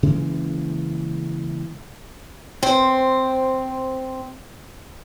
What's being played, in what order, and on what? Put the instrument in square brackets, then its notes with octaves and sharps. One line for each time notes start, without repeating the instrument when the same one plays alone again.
[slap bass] C#3 E3 G#3 A#3
[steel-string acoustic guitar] C4 C5